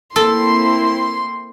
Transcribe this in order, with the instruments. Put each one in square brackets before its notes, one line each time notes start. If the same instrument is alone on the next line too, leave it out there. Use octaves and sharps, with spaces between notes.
[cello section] A#3 C4 E4 [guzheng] A4 [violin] C6